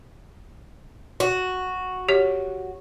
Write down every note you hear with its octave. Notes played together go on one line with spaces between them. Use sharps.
F#4
G4 C#5